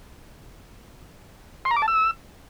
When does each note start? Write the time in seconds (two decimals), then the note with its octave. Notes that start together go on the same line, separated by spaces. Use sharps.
1.65 C6
1.71 A#5
1.77 D6
1.82 A5
1.88 E6